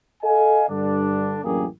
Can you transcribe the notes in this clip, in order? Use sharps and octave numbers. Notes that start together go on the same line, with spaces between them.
A4 D#5 F5 G#5
G2 D3 D4
A1 F#2 D3 A#3 G4 G#4